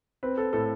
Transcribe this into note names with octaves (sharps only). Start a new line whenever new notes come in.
C4 B4
A4
A2 A4